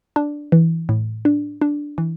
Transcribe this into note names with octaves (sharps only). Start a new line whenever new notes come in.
D4
E3
A2
D4
D4
E3